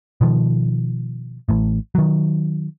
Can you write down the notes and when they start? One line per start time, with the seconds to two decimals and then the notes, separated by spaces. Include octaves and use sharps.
0.21 B2 D#3 F3
1.49 A1 A2
1.95 D#3 F#3